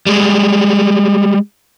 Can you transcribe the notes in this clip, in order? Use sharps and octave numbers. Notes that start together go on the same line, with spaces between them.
G3 G#3